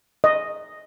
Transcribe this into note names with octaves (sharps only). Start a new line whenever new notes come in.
D#5